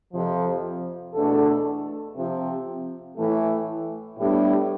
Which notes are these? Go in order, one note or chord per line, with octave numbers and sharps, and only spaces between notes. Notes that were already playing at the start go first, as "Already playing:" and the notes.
F2 C3 F3
E2 B2 A3 D4 A4
C3 F3 C4
A2 E3 A3
A2 G3 B3 D4 G4